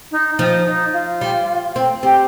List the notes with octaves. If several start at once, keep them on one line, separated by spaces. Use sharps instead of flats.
D#4
F3 D#4
D#4
F4
G3
C4
C4 G4